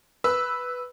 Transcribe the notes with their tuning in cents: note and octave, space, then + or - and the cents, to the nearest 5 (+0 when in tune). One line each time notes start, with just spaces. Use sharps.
B4 +0 E6 +0